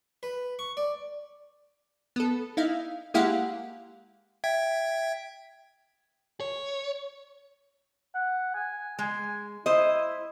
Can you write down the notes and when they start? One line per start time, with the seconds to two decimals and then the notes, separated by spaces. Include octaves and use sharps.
0.23 B4
0.59 C#6
0.77 D5
2.16 B3 A4
2.57 D#4 E4 F5
3.14 G#3 A#3 E4 G4 F5 F#5
4.44 E5 G5 G#6
6.40 C#5
8.15 F#5
8.54 G#5
8.99 G#3 G#5
9.66 E4 C5 D#5